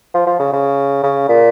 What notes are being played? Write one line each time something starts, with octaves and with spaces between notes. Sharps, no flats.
F3
F3
C#3
C#3
C#3
A#2